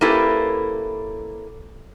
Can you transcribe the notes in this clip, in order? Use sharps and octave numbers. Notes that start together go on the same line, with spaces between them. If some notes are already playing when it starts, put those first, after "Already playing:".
A#3 C#4 E4 G4 A4 B4